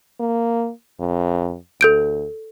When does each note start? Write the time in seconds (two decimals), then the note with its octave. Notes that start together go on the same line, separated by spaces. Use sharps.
0.20 A#3
1.00 F2
1.81 D2 A4 G6 D7